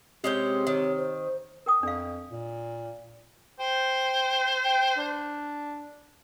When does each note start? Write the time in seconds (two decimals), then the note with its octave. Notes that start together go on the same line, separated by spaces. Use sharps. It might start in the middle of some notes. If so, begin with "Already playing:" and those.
0.24 C3 G#3 C#4 G5
0.67 D#3 C#5
0.98 C5
1.66 A#4 G5 D#6
1.83 F2 D4 F5
2.30 A#2
3.60 C5 G5
4.65 G5
4.98 D4